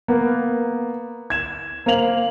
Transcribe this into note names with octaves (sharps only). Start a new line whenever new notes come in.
A#3 B3
G#6 E7
A#3 C5 F5 F7 F#7